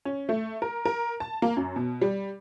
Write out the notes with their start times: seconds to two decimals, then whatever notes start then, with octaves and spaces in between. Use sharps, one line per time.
0.05 C#4
0.29 A3
0.62 A#4
0.85 A#4
1.20 A5
1.42 A#3
1.57 F#2
1.76 B2
2.01 G3